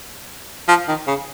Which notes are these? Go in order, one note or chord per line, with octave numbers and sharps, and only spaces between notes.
F3
D#3
C#3